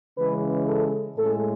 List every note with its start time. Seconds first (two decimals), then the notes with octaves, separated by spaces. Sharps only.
0.18 C#3 E3 G#3 C#4 B4
0.68 A4
1.17 A2 G#3 C#4 A4